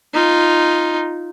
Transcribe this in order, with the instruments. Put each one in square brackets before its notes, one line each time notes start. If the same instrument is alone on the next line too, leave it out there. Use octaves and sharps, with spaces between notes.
[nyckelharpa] D#4 F4